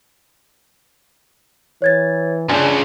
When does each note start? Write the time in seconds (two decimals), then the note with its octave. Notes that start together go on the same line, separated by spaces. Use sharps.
1.82 E3 C#5 G#6 A6
2.50 C#2 F#2 D4 G#5